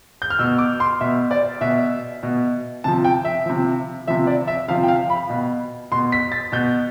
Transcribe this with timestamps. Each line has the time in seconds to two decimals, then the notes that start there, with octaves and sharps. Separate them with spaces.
0.22 G6
0.30 F6
0.39 B2 E6
0.58 D6
0.80 C6
1.00 B2 E5
1.31 D5
1.61 B2 E5
2.23 B2
2.84 C3 F3 A5
3.04 G5
3.25 E5
3.46 C3 F3
4.07 C3 F3 E5
4.27 D5
4.47 E5
4.68 C3 F3 F5
4.83 G5
4.88 F5
5.10 B5
5.29 B2
5.92 B2 C6
6.12 B6
6.32 A6
6.52 B2 G6